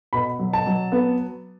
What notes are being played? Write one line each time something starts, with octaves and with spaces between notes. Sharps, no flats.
B2 B5
F#3
A5
F#3
B3